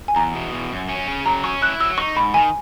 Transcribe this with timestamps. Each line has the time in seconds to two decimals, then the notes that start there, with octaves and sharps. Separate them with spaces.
0.08 G#5
0.16 E2 A#5
0.35 B2
0.53 E2
0.72 F#2
0.89 C#4
1.07 C#3
1.26 F#3 A#5
1.44 C#4 C#6
1.61 E4 F#6
1.80 F#3 E6
1.98 D#4 C#6
2.16 G#2 B5
2.34 D#3 G#5